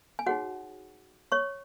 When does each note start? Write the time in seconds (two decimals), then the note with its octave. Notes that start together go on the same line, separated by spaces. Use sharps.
0.19 G#5
0.26 D#4 F#4 G#4 C#5 F#5
1.32 C#5 C#6